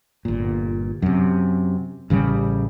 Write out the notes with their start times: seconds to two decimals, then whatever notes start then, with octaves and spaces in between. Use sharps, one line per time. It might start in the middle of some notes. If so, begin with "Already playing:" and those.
0.25 G1 A#2
1.02 F#2 C3
2.10 A1 C#3 F#3 G3